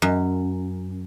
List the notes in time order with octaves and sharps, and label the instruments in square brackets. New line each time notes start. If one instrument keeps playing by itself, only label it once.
[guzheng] F#2